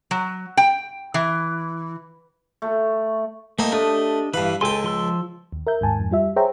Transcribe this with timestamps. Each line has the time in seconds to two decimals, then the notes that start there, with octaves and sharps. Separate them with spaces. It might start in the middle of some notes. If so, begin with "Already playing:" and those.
0.11 F#3
0.57 G5
1.14 E3
2.62 A3
3.59 A3 A#3 C4 D#4
3.72 A3 D4 G4 D#5
4.34 G2 E3 B4 F5
4.61 C#2 A4 G5 G#5 C6
4.84 F3 C6 E6
5.52 D#2
5.67 A#4 E5 G6
5.81 D#2 G#2 G#5 A5
6.00 F2 G#2
6.11 G3 F4 E5
6.36 G#4 C5 C#5 E5 G5 A#5